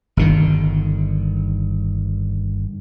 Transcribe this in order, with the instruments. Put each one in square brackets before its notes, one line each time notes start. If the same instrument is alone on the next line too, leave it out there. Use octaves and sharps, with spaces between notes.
[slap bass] G1 D3 D#3